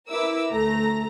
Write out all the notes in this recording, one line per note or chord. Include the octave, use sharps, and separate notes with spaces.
E4 A#4 B4 E5 D6 E6
D2 A3 A#5 A#6